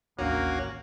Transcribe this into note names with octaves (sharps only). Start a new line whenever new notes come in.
A1 D#2 A#3 C#4 D4 F#4